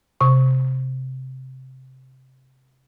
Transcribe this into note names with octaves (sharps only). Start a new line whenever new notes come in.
C3 C#6